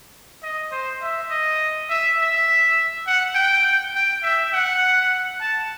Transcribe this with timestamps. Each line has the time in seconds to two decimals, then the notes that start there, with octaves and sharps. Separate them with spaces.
0.43 D#5
0.71 C5
1.02 E5
1.30 D#5
1.90 E5
2.18 E5
3.07 F#5
3.35 G5
3.95 G5
4.23 E5
4.53 F#5
5.41 A5